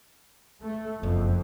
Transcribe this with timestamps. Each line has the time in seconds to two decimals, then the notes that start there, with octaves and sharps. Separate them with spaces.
0.60 A3
1.03 F#1 F2